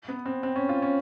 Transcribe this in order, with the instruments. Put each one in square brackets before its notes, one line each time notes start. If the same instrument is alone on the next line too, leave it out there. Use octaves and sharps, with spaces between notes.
[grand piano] B3
C4
C4
C#4
F4
C#4